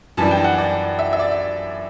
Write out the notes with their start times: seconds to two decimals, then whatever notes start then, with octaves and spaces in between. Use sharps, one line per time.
0.17 F#2 E3 G3 D4 A5
0.31 G5
0.44 F#5
0.58 D5
0.99 E5
1.13 E5
1.19 D5